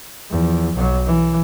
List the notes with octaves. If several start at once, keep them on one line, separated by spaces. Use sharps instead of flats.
E2 F3
B1 F#3
E3